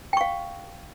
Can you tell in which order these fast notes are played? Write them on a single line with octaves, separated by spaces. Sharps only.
G5 C#6 F5